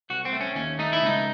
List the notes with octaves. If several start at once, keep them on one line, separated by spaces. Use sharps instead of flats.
C2 F#4
C4
A3
C#4
D#2 C#4
A3 D#4
E4
C#2 D#4